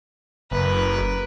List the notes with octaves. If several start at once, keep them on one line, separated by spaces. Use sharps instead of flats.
F#1 A#4 B4